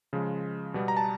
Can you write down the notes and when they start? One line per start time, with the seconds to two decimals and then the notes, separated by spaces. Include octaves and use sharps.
0.13 C#3 F3 G#3
0.74 B2 G3 B3
0.88 A#5
0.97 A5